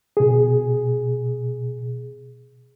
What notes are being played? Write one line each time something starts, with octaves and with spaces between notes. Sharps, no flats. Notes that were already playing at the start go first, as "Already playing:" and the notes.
B2 G#4